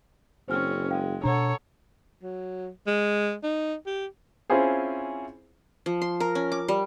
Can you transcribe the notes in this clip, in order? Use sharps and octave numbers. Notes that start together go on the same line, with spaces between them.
F#1 C4 C#4 C5 G#5 F6
G#3 F5 G5
B2 D4 A4 C#5 F#5 A#5
F#3
G#3
D#4
G4
C4 C#4 E4 F4 G#4 C5
F3
C6
A#4
C#4
D6
G3